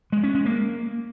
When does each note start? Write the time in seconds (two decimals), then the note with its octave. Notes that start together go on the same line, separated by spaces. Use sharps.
0.13 G#3
0.24 C#4
0.35 G#3
0.46 A#3